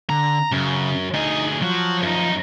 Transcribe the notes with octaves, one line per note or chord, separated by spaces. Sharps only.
D3 A#5
F#2 C#3
D2 D#4 G#4
F3 F#3 F#4
F#2 D#4